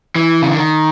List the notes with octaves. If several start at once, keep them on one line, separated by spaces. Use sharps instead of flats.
E3
C#3
D3
D#3